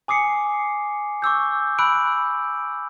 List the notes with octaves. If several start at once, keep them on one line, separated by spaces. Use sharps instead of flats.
G#5 D6 D#6 C7 C#7
C#6 D6 E6 G6
B5 E6 F#6 D7